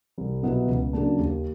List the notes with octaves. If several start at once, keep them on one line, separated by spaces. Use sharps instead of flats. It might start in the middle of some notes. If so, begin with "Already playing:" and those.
C2
B2 F#3 B3 E4
C#2
C#3 F#3 A#3 D4
D#2